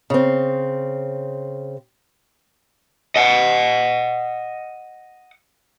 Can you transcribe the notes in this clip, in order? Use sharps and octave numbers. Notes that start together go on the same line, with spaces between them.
C#3 C4
D#5 F#5